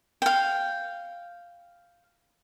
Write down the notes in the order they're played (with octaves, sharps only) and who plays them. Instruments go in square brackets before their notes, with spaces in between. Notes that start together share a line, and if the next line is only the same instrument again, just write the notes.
[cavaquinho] F5 G5